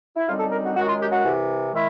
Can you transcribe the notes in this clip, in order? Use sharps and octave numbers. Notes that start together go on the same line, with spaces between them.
E4
F#2 D3 G3 C4 D#4 F4
A4
A#4
F#4
F#2 D#3 G#3 F#4
F4
G4
F#4
C2 C3 E3
D#3 G#3 E4